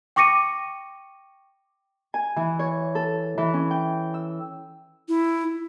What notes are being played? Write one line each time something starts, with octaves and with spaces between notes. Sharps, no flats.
G5 C#6 D6 A#6 C#7 D#7
G#5
E3
C#5
A4
E3
C#4
G5
E6
E4